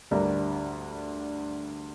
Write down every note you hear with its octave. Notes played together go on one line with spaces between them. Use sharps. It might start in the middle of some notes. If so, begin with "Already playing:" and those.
D2 D3 G3 D4 A#4